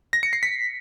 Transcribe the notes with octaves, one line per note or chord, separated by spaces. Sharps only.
A#6
C#7
C7
B6